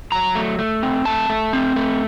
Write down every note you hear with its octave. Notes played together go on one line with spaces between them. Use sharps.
F#3 A#5
A3
A3
C4
A3 A5
A3
C4
A3